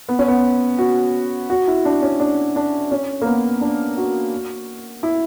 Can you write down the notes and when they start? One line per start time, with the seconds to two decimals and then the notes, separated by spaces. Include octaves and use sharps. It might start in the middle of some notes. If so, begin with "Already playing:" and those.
0.09 B3
0.19 C#4
0.28 B3
0.78 F#4
1.50 F#4
1.68 E4
1.85 D4
2.02 C#4
2.20 D4
2.56 D4
2.91 C#4
3.22 A#3
3.26 B3
3.61 D4
3.97 F#4
5.03 E4